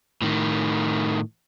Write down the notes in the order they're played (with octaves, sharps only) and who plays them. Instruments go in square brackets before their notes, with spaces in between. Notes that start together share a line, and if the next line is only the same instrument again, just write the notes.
[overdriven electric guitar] A2 D#3